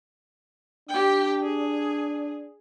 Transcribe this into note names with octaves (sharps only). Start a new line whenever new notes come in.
D4 G4 G5
G#4